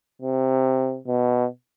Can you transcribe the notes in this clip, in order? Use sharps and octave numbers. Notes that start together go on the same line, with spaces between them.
C3
B2